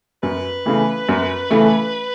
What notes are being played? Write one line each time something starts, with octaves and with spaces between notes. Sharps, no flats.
F#2 B4
C#3 E3 A3
F#2
C#3 E3 A3